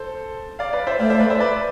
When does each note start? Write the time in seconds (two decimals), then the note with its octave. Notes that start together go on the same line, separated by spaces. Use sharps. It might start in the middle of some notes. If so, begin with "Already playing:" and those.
Already playing: A4 C5
0.59 D5 F5
0.73 B4 D5
0.87 C5 E5
0.99 A3 D5 F5
1.10 C5 E5
1.20 B4 D5
1.30 C5 E5
1.40 B4 D5